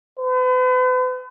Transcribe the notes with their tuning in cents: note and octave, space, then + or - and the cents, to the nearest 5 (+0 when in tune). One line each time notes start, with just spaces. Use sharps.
B4 +45